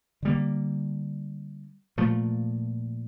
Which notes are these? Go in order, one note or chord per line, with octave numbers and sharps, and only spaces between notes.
D3 G3 A#3
A#2 F3 A3